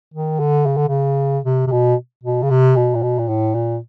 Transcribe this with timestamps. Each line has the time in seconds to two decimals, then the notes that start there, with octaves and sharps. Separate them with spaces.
0.14 D#3
0.40 D3
0.66 C#3
0.77 D3
0.88 C#3
1.44 C3
1.67 C3
1.71 B2
2.23 B2
2.43 C#3
2.50 C3
2.76 B2
2.95 A#2
3.02 B2
3.19 A#2
3.28 A2
3.54 A#2